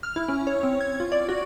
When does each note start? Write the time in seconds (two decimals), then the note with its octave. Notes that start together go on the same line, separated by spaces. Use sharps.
0.03 F6
0.16 E4
0.28 C#4
0.47 C#5
0.63 C4
0.81 G#6
1.00 F4
1.12 D5
1.29 F#4